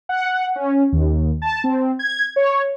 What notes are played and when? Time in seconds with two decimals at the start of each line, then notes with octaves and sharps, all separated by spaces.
0.09 F#5
0.56 C#4
0.92 D#2
1.42 A5
1.64 C4
1.99 G#6
2.36 C#5